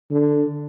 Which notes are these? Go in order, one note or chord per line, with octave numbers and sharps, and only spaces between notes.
D3